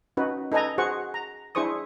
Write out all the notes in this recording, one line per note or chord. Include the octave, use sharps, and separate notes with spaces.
C#4 D#4 F#4 B4
D#4 A4 B4 D#5 G#5 A#5
F#4 G#4 C5 F#5 C#6
A#5
D4 E4 G#4 C5 C#6 D#6